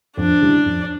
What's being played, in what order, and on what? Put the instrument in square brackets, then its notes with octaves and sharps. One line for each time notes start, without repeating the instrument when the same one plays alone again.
[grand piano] F2 [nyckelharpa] D4
[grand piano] D3 G3 C#4 E4
F2